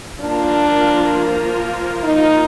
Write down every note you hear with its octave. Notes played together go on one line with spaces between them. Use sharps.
F3 A#3 D4 F4 A#4
D#4